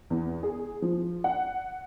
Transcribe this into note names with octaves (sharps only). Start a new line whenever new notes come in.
E2
G#4
F3
F#5